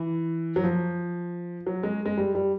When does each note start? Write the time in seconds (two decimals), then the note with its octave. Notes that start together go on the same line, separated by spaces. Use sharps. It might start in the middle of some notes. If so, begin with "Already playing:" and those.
Already playing: E3
0.56 F#3
0.64 F3
1.67 F#3
1.83 G#3
2.06 G#3
2.17 G3
2.35 G3